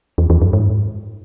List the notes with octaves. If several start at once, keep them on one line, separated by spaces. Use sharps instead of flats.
E2
E2
F#2
G#2